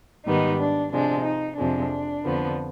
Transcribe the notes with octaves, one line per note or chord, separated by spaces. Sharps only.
G#2 D#3 G3 B3 D#4
D4
C3 F3 G#3 D4
D#4
F2 C3 F3 G#3 D4
F2 D3 F3 B3